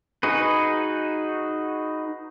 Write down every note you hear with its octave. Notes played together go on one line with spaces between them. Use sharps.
D#4 F#4 G#4 B4